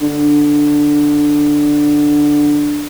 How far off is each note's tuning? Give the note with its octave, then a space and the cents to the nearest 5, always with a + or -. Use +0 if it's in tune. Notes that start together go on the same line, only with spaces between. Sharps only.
D3 +5